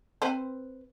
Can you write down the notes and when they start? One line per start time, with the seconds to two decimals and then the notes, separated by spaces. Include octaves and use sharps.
0.22 C4 B4 C5